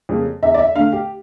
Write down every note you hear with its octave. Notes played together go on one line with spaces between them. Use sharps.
F2 C#3 G3 A#3
E2 E5
D5
E5
D3 A3 F5
G4